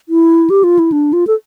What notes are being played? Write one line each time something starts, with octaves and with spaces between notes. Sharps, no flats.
E4
G4
F4
E4
D4
F4
A4